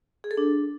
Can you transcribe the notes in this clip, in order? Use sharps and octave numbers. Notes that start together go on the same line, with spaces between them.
G#4
A4
D4